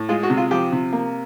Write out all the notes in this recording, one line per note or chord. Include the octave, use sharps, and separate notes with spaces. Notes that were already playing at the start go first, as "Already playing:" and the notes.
Already playing: A2
G#3 F4
F#4
C3
F4
F3 G4
C3
A#3